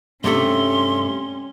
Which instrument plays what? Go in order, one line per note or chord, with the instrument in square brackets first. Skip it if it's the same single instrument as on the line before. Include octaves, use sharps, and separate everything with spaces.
[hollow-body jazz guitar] G2 C3 A3 [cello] C#4 [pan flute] C6